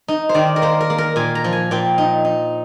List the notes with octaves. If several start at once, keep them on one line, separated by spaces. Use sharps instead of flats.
D#4
C5
D#3 D5
A#4
A#3 C5
A#4
A#3
A#4
A#2 G#5
A#5
F3
G#5
A#2 G5
D#4
D#4